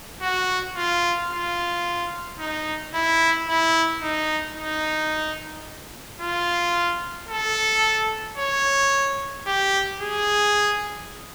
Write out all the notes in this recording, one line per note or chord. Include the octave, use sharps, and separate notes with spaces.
F#4
F4
F4
D#4
E4
E4
D#4
D#4
F4
A4
C#5
G4
G#4